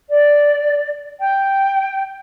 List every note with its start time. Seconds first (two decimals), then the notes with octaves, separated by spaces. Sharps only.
0.09 D5
1.20 G5